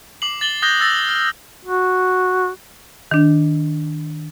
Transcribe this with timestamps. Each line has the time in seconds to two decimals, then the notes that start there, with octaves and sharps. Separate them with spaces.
0.22 D6 C7 F#7
0.41 A6 F#7 G7
0.62 D#6 F#6 G6 A#6 G7
0.81 E6 A6 A#6
1.09 F6
1.65 F#4
3.11 D#3 D4